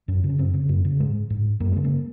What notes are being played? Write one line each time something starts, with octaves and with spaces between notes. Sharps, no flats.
F#2 C#4
C#3
C#4
F#2 C4
C#3
F#2 A#3
C#3
G#2 G#3
G#2
F#2 A#3
C#3 G#3
A#3